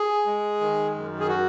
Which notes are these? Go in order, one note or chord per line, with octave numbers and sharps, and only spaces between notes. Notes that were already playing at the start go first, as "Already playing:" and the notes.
Already playing: G#4
G#3
D#3
F#2
G#4
F#4